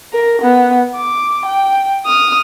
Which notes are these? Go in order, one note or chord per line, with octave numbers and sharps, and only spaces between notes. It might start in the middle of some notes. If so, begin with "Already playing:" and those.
A#4
B3
D6
G5
D#6 F6